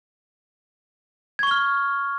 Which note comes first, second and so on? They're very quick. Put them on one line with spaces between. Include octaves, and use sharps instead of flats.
G#6 C#6 G7 F6